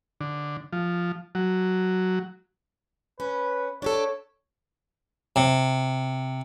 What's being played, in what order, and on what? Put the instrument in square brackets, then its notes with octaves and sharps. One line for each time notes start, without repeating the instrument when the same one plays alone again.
[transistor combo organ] D3
F3
F#3
[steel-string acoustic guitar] C#4 [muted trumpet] B4
[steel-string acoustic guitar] D4 G4 A4 [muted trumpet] C#5
[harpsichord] C3